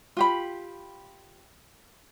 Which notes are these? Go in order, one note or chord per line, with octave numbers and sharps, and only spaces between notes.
F4 G4 B5